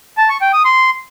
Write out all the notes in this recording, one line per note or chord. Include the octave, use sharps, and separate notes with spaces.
A5
C#6
G5
D#6
C6